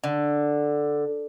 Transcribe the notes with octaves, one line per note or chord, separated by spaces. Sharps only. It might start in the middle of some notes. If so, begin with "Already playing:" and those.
D3